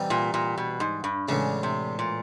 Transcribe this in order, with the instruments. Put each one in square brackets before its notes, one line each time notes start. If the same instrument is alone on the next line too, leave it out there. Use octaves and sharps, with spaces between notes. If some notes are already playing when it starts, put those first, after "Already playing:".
Already playing: [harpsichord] C3 E3 G3 B3 D#4
[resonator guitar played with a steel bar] A#2
A#2
B2
G#2
G2
[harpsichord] A2 E3 G#3 B3 D4 [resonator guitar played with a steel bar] C#3
[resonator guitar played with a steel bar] C3
A#2